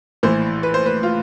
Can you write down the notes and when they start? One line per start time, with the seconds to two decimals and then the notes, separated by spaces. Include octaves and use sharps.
0.23 A#1 A2 E3 C5
0.63 B4
0.74 C5
0.86 B4
1.03 F4